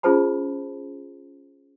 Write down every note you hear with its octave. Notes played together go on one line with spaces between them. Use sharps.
C#4 F4 G#4 C5 A5 B5